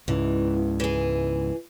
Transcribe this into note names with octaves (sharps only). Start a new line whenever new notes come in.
C#2 G#2 C#3 E3
E3 G#4